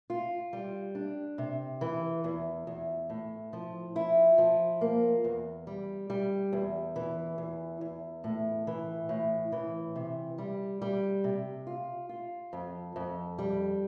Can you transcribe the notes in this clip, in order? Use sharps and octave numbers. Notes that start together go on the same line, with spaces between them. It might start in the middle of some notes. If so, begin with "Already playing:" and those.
F4
G3
D4
C3
E3
E2
E2
A2
F3
E4
F3
A#3
E2
G3
G3
E2
E3
E2
E2
A2
E3
A2
E3
C3
G3
G3
C3
F4
F4
F2
F2
G3